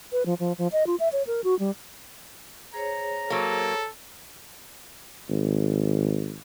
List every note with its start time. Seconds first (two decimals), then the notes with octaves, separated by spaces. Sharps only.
0.12 B4
0.26 F3
0.40 F3
0.58 F3
0.72 D#5
0.87 F4
1.00 E5
1.13 C#5
1.27 A#4
1.44 F#4
1.59 G3
2.74 G#4 C5 C#5 A#5
3.30 F#3 A#3 A4
5.29 G#1